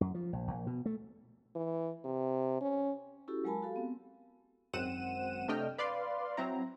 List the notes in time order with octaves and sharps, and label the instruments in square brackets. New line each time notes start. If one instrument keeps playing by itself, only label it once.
[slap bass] F#2
F3
A#1
A#1
B2
A3
[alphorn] E3
C3
C#4
[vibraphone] C#4 E4 F#4 G4 A4
F#3 G#3 A#4 G#5 A5 B5
F#4 G4 A4 F5
B3 C4
[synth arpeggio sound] G#1 F#2 C4 F#5 D#7 E7
C3 A3 D4 D#5 G5 F6
B4 D5 F5 C6
F#3 C4 E4 A#5